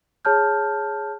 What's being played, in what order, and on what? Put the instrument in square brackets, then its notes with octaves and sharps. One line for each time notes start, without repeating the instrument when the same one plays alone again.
[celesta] G#4 C#5 A5 F6 G6